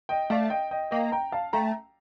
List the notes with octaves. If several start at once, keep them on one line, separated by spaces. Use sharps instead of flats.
D#5 G5
A3 D5 F5
D#5 G5
D#5 G5
A#3 D#5 G5
G5 A#5
F5 A5
A3 G5 A#5